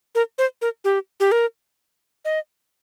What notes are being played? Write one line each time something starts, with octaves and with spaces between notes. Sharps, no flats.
A#4
C5
A#4
G4
G4
A#4
D#5